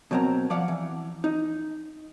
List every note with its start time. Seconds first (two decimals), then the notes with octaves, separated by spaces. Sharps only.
0.11 B2 F#3 C4 A#4 A#5
0.50 F3 D5 F5 F#5
0.68 E3
1.24 D#4